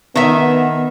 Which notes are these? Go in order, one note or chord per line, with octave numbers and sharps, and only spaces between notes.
D#3 B3 E5